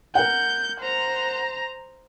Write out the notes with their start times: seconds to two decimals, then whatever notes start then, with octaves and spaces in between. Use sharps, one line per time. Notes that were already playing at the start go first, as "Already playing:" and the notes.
0.15 A#4 F#5 G6
0.80 C5 A#5